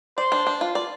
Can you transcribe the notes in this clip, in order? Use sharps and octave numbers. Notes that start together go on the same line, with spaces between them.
C5 D5
D4
D4
F4
D5